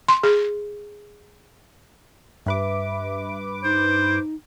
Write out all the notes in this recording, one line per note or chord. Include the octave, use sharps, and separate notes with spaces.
C6
G#4
G2 B4 E5 D6
D#4 C5